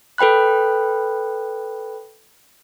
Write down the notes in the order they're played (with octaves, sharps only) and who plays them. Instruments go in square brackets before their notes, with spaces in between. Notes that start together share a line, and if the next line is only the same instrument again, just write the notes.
[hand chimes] A4 B4 G5 B5 F#6